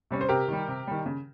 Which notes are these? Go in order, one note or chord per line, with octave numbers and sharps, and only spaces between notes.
C3 G3 C#4
C5
C3 G4 A#4
D#3 G3
C3
D#3 G3
C#3